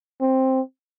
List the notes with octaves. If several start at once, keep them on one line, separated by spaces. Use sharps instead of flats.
C4